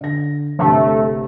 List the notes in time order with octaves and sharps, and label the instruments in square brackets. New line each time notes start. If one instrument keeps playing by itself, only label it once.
[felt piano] D3 A#6
[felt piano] G1 C3 [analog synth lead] A3